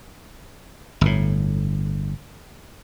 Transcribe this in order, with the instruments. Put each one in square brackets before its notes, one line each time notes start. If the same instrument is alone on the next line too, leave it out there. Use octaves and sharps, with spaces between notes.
[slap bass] G1 A2